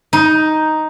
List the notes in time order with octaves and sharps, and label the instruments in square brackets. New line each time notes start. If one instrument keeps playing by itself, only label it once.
[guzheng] D#4